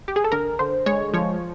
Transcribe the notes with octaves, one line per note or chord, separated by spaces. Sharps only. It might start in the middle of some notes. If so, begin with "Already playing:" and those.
G4
G#4
A4
D3 A#4
D3 C5
G#3 C#5
F3 C#5